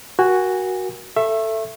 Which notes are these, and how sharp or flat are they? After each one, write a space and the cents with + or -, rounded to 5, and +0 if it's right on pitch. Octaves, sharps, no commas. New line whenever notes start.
F#4 +0 A#4 +25 G#5 -25
A4 +10 E5 +15 C#6 -30